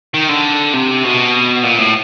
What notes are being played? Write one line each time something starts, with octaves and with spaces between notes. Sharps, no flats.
D#3
D3
C3
B2
A#2
A2